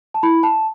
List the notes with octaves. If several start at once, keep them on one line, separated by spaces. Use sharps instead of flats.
A5
E4 B5
A5